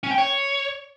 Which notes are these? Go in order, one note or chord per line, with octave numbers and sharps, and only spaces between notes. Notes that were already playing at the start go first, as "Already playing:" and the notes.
C#4
G5
C#5